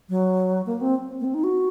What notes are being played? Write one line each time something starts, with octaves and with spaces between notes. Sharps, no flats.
F#3
A#3
C4
A#3
C4
D#4
F#4